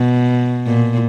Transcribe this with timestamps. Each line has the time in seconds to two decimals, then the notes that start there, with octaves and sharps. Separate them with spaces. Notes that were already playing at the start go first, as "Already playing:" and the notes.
Already playing: B2
0.66 A#2